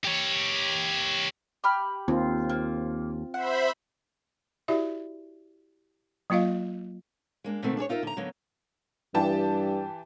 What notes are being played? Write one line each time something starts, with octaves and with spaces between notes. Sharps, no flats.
G4 C#5
G4 B5 F6
D#2 C4 F4
A#3
C5 E5 F#5 B5
E4 F#4 G4 D5 E5
F#3 A#3 F4 D#5 F5
G#3 A#3 D4
B2 D3 D#3 A3 C4
D4 G#4 A4 C#5
D#4 F4 A#4 E5
D3 A#5
D3 F#3 A#3 B3 C#5
G2 E3 G4 A5